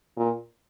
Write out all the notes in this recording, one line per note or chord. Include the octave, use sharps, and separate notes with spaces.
A#2